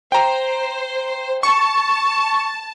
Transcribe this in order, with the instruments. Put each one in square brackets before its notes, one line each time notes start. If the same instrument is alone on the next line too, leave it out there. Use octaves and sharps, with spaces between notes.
[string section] C5 [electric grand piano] G5 A#5
[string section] A5 [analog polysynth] C#6